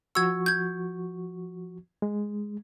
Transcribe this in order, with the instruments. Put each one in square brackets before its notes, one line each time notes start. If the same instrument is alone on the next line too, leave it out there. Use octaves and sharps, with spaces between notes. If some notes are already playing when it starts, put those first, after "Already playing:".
[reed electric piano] F3 F#4 C#6 [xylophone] E6 G#6
[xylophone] G6 G#6
[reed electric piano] G#3